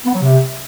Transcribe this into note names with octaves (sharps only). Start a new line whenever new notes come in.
B3
F#3
C3